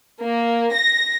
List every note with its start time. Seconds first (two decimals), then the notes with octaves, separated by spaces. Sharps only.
0.23 A#3
0.75 A#6